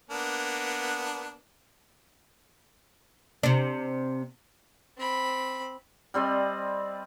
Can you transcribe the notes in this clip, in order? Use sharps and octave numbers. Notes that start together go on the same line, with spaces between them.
A#3 B3 D4
C3 D4
C4 B5
G3 C4 D5 D#5